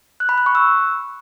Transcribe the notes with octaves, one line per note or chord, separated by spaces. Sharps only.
F#6
B5
F#6
C#6
E6